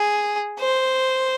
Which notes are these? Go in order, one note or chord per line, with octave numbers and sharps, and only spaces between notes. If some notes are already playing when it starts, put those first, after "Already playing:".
Already playing: G#4
C5